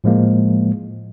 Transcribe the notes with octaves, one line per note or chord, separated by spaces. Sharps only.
A2 F3 G#3 A#3